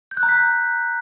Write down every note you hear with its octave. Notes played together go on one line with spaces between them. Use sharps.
G6
F#6
A#5
B6